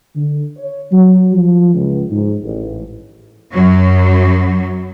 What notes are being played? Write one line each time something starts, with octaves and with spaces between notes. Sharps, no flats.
D3
C#5
F#3
F3
C#2
G#2
A1
F#2 F#3